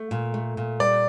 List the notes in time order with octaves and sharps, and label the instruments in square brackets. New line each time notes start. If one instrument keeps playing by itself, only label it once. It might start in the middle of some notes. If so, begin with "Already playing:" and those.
Already playing: [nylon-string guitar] A3
A#2
A3
A#2
[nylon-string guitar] G3 [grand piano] D5